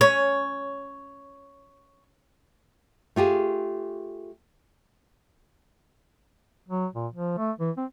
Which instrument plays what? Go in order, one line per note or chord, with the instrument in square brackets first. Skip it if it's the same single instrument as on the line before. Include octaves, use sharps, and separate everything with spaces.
[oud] C#4 [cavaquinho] C#5
[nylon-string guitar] A3 F4 G4 G#4
[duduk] F#3
A#2
F3
A3
E3
C4